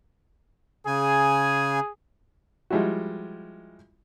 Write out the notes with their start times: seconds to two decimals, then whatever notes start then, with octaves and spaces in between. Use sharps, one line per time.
0.87 C#3 G#4 G#5
2.70 F3 G3 G#3 E4 F#4